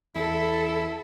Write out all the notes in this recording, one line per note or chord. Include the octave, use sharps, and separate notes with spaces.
E2 E4 A4